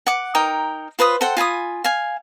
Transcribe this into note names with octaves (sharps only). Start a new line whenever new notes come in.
F#5 D6
D#4 A#4 G5
F4 B4 C5 D#6
A4 C5 F#5 G5
F4 G#5 B5 D#6
F5 G#5